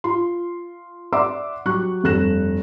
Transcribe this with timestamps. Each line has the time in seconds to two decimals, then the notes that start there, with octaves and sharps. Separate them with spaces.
0.04 F4 C6
1.13 D5 E5 F#5 C6 D6 E6
1.66 F#3 G4 C#6 F#6
2.04 F1 G2 A4 F#6 A#6 E7